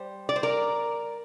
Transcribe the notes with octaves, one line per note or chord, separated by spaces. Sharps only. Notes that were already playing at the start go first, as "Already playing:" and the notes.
Already playing: G3 C5
D5
C5
A#4 D5